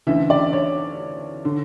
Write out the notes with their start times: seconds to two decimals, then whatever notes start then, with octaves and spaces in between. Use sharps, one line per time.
0.07 D2 C#3 E3 E5
0.30 D5
0.53 C#5
1.45 D3